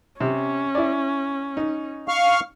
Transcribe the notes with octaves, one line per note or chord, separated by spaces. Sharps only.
C3 C#4
E4 D5
D#4
F5 C#6 F6